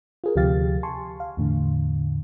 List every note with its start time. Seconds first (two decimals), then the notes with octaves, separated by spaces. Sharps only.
0.24 F4 G#4 A#4
0.36 D2 C3 F3 G4 F5 A6
0.83 G#5 A5 C6 C#6
1.20 F5
1.37 E2 A2 D3